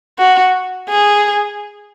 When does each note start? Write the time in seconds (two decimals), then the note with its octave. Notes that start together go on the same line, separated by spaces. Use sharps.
0.18 F#4
0.89 G#4